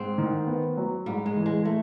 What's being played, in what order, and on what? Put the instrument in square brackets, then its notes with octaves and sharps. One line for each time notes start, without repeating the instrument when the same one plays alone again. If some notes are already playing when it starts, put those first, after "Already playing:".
Already playing: [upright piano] G#2 [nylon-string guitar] C4
[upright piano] D#3
B3
F#3
[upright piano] G#2 [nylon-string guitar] G3
[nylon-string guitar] G#3
[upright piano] E3
[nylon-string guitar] G#3
A3